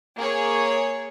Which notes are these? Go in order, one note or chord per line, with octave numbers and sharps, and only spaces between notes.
A#3 G#4 C#5